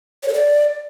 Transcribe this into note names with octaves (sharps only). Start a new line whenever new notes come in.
C#5
A4
D5